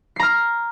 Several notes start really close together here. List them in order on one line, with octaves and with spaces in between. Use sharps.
C7 A#5 F6